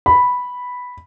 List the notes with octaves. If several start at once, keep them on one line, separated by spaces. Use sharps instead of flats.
B5